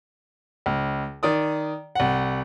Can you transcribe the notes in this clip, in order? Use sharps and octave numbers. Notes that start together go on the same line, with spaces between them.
C#2
D#3 D5 D#6
C2 F#5